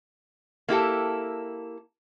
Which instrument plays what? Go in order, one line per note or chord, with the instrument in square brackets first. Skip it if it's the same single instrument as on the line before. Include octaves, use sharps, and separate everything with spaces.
[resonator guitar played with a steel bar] A#3 E4 G4 A4